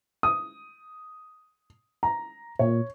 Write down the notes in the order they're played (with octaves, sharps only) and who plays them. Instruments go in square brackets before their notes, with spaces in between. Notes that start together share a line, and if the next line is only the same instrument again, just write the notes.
[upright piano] D#6
A#5
[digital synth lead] A#2 [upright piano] C#5